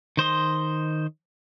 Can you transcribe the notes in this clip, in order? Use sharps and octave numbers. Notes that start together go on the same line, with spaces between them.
D#3 C5 D#5 C6